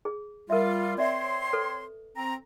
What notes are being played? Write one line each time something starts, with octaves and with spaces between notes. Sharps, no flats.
G#4
G3 F4 A#4 E5
C4 C#5 D5 E5 C6
A4 B4
C4 A#5